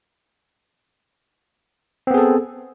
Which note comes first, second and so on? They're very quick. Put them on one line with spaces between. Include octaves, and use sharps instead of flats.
C4 B3 G#4 A4